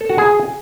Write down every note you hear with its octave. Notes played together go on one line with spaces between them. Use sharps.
A4
F#4
G#4